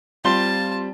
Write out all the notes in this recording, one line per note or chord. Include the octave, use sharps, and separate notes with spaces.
G3 C4 F4 A5 C6 G7